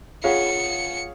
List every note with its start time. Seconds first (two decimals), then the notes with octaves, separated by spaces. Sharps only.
0.24 F4 G#4 C#5 F5 F#5 C#7